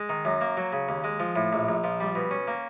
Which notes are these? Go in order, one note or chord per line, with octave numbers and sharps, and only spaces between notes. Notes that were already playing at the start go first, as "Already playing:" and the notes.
Already playing: G#3
D#3
F#2
A#3
F#3
C#3
D#2
G#3
F3
A2
A#1
A#1
F3
G3
B2
C#4
A#3